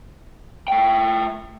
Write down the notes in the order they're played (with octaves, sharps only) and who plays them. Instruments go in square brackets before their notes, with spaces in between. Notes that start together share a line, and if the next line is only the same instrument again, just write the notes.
[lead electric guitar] A3 G5